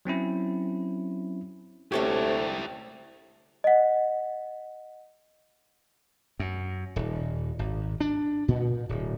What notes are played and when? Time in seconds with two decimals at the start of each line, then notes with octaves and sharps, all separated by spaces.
0.05 F#3 C4 C#4 E4
1.92 D2 C3 A3 C#4 E4 G4 A4 C#5
3.64 D#5 F#5
6.40 F#2
6.96 D#1
7.59 G#1
8.01 D4
8.48 A#2
8.89 D1